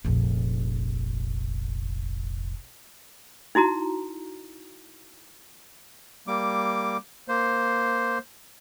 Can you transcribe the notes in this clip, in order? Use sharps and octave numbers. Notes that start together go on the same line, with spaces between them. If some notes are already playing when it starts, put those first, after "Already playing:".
F1 A#1
D#4 E4 F#4 A#5
G3 A#3 D6
A#3 C5